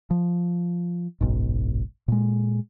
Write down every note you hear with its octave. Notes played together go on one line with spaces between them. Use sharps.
F3
F#1 B1 G#2
A#2 G#3